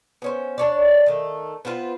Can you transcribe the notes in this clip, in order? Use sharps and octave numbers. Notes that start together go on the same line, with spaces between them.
B3 C#4 C5
D4 C#5 D5
D#3 A3
B3 C4 F4 B4